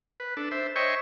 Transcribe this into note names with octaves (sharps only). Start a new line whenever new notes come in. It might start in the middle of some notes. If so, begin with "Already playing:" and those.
B4
D4 A4
C5 E5
C5 C#5 D#5 E5 G5 C#6